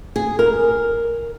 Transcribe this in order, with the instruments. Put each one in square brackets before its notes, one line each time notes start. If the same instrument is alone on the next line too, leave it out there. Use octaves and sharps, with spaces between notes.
[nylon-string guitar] G#4
A#4